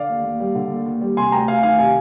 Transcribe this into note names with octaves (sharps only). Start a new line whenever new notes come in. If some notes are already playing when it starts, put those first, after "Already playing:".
Already playing: D3 D5 F5
D#2
D#2
G3
D3
D#2
D#2
G3
C3 G#5 C6
D2 G5 A#5
D2 F5 G#5
D#3 F5 G#5
C3 F5 G#5